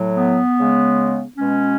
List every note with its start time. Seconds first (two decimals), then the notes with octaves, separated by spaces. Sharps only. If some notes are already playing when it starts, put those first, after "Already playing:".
Already playing: A2 F#3
0.16 B3
0.56 C#3 G#3
1.37 B2 G#3 C#4